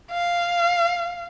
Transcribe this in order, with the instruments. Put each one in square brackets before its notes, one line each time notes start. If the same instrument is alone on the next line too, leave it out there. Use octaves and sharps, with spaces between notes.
[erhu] F5